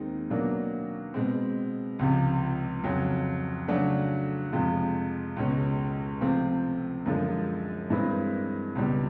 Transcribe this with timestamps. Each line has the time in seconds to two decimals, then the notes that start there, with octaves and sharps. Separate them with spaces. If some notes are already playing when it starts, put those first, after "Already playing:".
Already playing: D#2 D#3 G#3 C4 D#4
0.30 B2 F#3 A#3 D4
1.14 B2 G#3 C4
1.99 C#2 C3 F3
2.83 F2 C#3 F#3
3.68 C#3 F#3 A3 D4 F#4
4.52 F2 C3 F3 G#3
5.37 C#2 B2 G#3 C#4
6.21 C3 F3 A3 C4
7.06 F#2 D3 F3 G#3
7.90 G2 E3 G#3 C4 E4
8.75 C#2 B2 G3